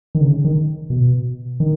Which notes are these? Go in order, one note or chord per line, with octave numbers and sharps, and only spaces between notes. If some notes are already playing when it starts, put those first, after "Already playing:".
D#3
C#3
D#3
B2
D#3